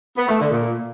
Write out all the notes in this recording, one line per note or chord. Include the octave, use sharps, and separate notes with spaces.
B3
A3
D3
A#2